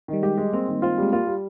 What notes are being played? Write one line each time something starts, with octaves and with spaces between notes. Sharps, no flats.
D#3 G3
G#3 G4
G#3
A#3 C4
D#3
C4 F4
G3 G#3
A#3 F4
G3